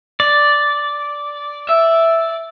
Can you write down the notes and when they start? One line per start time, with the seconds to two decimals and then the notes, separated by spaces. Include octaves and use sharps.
0.20 D5
1.69 E5